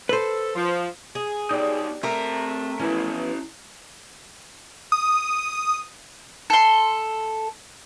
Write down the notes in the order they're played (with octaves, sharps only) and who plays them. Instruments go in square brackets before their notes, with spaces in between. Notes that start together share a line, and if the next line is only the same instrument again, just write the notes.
[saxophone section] A4 [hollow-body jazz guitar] B4 C5
[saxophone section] F3
[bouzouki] G#4
[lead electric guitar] B3 D#4 [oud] G4 D5
[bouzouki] A3 A#4 [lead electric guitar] C4 A#5
[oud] E3 F3 B3 [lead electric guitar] C#4 E4
[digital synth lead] D#6
[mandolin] A4 C6